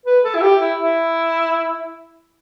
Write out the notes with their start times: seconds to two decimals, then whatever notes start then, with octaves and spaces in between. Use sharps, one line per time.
0.06 B4
0.24 A4
0.35 E4
0.42 G4
0.60 E4
0.79 E4